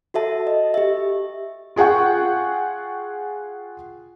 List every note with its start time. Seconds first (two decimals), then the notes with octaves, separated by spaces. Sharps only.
0.14 F#4 A4 E5 A5
0.47 D#5
0.74 G4 E5
1.76 F4 G#4 F#5 G5 C#6